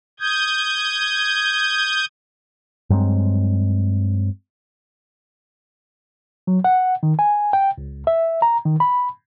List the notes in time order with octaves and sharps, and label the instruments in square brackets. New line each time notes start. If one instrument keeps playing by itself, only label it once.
[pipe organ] D#6 G6 G#6
[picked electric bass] G2 F#3 G#3 C4
[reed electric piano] F#3
F#5
D#3
G#5
G5
C#2
E5
A#5
D#3
B5